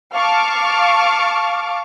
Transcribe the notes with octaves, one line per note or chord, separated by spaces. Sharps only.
F5 A5 C#6 D6 F6